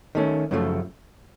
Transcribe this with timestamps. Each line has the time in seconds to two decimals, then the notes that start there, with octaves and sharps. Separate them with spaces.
0.15 D#3 A3 C#4
0.51 F#2 C#3 F3 A3